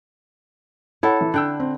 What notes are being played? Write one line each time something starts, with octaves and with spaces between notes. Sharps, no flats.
E4 A4 C#5 F#5
E3
D3 G5 E6 F#6
C4